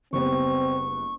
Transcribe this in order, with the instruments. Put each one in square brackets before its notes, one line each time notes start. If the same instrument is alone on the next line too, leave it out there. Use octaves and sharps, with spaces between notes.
[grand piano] F#1 G3 B3 [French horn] C4 [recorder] C#6